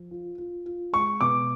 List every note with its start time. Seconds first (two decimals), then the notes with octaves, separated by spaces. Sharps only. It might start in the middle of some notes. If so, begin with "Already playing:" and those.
Already playing: F3
0.11 F4
0.38 F4
0.66 F4
0.93 G#3 C#6
1.21 B2 D6